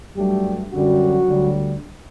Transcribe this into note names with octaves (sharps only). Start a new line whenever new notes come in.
G2 F#3 G3 A3 G4
F#2 D3 F#3 G3 F#4
D2 D3 G3